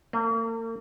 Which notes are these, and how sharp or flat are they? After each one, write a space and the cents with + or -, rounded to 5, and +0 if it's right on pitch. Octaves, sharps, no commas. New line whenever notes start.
A#3 -40